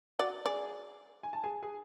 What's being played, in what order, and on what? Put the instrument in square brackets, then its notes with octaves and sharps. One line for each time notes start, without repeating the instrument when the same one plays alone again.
[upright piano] F#4 F#5 [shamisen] D5
[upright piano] G#4 G#5 [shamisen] D5
[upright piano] G#5
A5
G#4 G#5
G#4 G#5